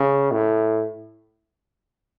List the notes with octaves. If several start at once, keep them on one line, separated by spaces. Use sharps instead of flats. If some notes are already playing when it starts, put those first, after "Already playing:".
Already playing: C#3
A2